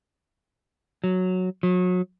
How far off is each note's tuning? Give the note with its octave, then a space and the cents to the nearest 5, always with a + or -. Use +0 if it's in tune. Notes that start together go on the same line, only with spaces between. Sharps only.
F#3 -5
F#3 -30